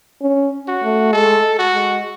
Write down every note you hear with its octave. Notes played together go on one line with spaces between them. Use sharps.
C#4
F#4
A3
G#3 A4
F#4
G#3